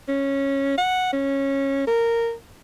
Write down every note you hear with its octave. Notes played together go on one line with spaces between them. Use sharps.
C#4
F#5
C#4
A#4